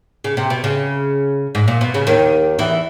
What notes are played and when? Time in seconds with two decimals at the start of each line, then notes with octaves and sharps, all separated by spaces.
0.24 C#3
0.37 C3
0.50 B2
0.64 C#3
1.55 G#2
1.68 A#2
1.81 B2
1.94 C#3
2.07 D#2 D#3
2.59 E2 E3